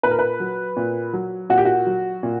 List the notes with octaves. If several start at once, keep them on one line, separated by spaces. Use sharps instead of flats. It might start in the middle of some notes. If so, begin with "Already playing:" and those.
A#2 B4
A#4
B4
F#3
A#2
F#3
A#2 F#4
G4
F#4
F#3
A#2